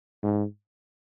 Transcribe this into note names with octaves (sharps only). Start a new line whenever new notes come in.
G#2